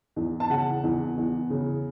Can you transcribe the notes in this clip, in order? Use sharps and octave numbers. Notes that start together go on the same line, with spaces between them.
E2
A5
C#3 F#5
E2
E2
C#3